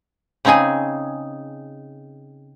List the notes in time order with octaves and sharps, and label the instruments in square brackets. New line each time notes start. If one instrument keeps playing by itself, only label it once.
[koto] C#3 C4 D#4 G#4 G#5